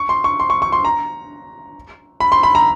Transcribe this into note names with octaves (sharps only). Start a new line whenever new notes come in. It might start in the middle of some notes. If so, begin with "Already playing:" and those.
Already playing: C#6
C6
C#6
C6
C#6
C#6
C6
A#5
B5
C6
B5
A#5